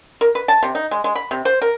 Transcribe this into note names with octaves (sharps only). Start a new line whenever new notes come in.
A#4
B4
A5
C3
D#4
G#3
G#3
B5
C3
C5
A#4